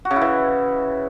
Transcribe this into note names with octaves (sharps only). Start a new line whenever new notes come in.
F#4
C#3
E4
E3